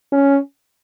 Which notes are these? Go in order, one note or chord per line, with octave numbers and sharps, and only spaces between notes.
C#4